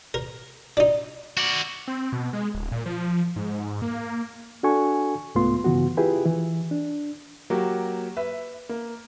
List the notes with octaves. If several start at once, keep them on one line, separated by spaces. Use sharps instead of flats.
A#4
D4 D#4
F#4 D5
C4
B2
G#3
D1
A#2
F3
G#2
A#3
D4 F#4 A4 G#5 C#6
C2 G#2 A3 B3 F4 C6
G2 C#3 E3 B3 F#4
E4 F4 G4 G#4 B4
E3
D4
F#3 A#3 F#4 G4
B4 E5
A#3